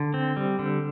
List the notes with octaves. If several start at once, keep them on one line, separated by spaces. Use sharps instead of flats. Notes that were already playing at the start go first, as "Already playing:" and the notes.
Already playing: D3
C4
G3
D3